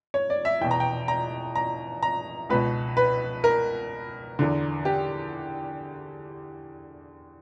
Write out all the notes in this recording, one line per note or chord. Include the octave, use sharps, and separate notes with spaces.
C#5
D5
E5
E2 B2 G5
A#5
G5
A#5
A#5
A#5
C#2 B2 B4
B4
A#4
E2 D3
G4